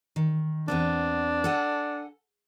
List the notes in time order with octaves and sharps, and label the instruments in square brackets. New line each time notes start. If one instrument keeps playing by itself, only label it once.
[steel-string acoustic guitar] D#3
[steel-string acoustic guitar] E2 B3 C4 [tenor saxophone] D4
[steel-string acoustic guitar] A4 F#5 G#5